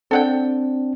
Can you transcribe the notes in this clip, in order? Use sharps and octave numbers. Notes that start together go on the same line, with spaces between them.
C4 D4 A4 F#5 G5